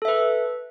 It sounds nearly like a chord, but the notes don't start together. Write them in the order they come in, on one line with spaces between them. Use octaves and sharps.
A4 E5 B4